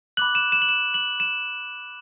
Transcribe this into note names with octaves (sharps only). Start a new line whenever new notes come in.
B5 D6 F#6 F#7
E7
E7
F#7
E7
F#7
E7